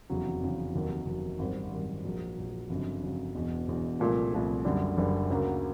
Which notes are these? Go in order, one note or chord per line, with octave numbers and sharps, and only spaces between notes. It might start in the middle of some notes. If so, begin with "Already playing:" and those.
F1 E2 C#3 F#3
F1 E2 C#3 F#3
F1 D#2 D#3 F#3
F1 D#2 D#3 F#3
G#1 F#2 D#3 G3
G#1 F#2 D#3 G3
A#1 A#2 F#3
A#1 A#2 F#3
G1 F2 C#3 F#3
G1 F2 C#3 F#3
E1 E2 B2
E1 E2 B2
C2 A#2 F3 A3
C2 A#2 F3 A3
F#1 F#2 D3 G3
F#1 F#2 D3 G3
D2 C#3 F#3 A#3